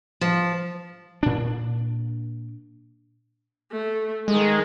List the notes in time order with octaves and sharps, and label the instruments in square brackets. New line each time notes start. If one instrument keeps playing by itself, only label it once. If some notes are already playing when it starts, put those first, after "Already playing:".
[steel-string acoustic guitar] F3
[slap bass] A#2 D4
[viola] A3
[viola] D#3 G#4 [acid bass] G#3